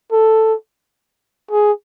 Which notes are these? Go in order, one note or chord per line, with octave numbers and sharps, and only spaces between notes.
A4
G#4